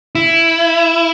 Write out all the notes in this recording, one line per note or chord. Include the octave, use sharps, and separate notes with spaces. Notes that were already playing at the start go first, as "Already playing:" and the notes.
E4